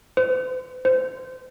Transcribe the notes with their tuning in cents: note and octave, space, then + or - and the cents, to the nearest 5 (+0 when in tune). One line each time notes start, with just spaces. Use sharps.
C5 -45
C5 -25